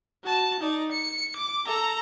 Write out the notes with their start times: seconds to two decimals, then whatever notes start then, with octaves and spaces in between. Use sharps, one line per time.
0.24 F#4 A5
0.60 D#4 D5
0.92 C#7
1.37 D6
1.66 A4 A#5